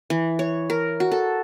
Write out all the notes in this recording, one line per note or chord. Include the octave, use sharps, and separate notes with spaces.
E3
C#5
A#4
F#4
A4